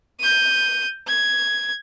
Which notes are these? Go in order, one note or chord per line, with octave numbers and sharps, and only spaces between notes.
G6 D#7
G#6